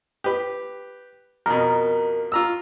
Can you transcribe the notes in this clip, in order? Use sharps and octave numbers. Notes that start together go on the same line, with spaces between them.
G4 B4
F2 B2 A#4
F4 A#5 E6